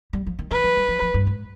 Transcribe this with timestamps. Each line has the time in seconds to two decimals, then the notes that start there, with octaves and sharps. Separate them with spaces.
0.13 G3
0.26 F3
0.39 D#3
0.51 D#3 B4
0.64 F3
0.77 G3
0.88 F3
1.02 F3
1.14 G2
1.27 G#2